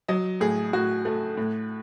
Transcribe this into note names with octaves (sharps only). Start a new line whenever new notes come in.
F#3 D#5
A2 G#4
A2 F#4
A3
A2